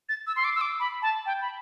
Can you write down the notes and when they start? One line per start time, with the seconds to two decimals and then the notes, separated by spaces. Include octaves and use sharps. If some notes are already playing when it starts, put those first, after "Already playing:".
0.09 A6
0.27 E6
0.36 C6
0.44 D6
0.55 E6
0.61 D6
0.80 B5
1.02 A5
1.26 G5
1.41 B5